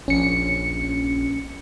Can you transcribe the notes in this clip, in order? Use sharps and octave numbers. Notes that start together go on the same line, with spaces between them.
A#1 C#4 C#7